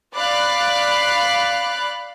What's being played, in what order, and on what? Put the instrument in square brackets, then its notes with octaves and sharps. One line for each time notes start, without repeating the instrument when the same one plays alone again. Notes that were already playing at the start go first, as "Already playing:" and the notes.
[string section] D5 F5 B5 F#6